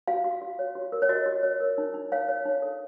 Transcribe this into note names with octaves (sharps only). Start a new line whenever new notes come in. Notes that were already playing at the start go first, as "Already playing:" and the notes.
F#4 F5
F#4
F#4
C#5
F#4
A#4
C#5
F#4 D#5
F#4
C#5
A#4
D#4
D#4
C#5 F5
C#5
D#4
A4